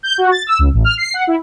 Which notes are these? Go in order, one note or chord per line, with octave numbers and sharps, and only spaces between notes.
G6
F#4
A6
E6
C#2
A1
F6
C7
F#5
E4